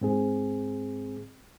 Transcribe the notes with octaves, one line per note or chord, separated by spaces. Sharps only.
G#2 C4 G#4